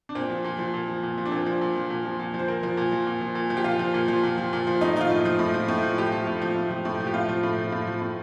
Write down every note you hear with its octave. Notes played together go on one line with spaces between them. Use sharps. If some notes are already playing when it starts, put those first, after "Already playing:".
D4
A#2 C4
F3
A#2
F3
A#2
F3
A#2
F3
D4
A#2 C4
F3
A#2
F3
A#2
F3
A#2
F3
C5
A#2 A#4
F3
A#2
F3
A#2
F3
A#2
F3
G4
A#2 F4
F3
A#2
F3
A#2
F3
A#2
F3
A2 D#4
F3 D#4 F4
A2
F3
A2
F3
A2
F3
A2 G4
F3
A2
F3
A2
F3
A2
F3
G4
A2 F4
F3
A2
F3
A2
F3
A2